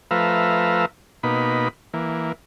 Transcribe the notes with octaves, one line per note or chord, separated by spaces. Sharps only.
F3 A3 B4 E5 F5 A#5
B2 A#3 D#4 B5
E3 A#3